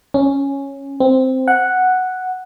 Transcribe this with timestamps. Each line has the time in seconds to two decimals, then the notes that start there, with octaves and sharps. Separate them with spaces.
0.14 C#4
1.00 C4
1.48 F#5